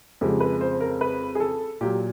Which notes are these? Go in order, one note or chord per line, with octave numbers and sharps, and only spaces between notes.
F2 C#3 F3 G#3 G4
B4
C5
A#4
B4
G#4
A4
A#2 F#3 G4